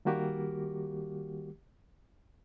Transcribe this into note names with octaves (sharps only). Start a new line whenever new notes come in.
D#3 G3 A#3 F#4 G4 A#4